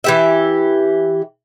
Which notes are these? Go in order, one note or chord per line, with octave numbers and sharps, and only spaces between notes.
E3 G4 E5